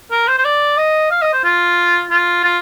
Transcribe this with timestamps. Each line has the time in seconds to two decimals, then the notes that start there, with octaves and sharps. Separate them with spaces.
0.11 A#4
0.28 C5
0.39 C5
0.45 D5
0.77 D#5
1.11 F5
1.21 D#5
1.33 C5
1.44 F4
2.10 F4
2.44 F4